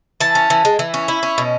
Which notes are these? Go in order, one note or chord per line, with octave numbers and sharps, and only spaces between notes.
E3 A5
C#4
E3
G#3
E3
C#4
E4
C#4
B2